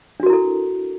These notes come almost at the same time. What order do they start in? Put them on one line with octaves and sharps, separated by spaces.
D4 F#4 A#4 E4 A4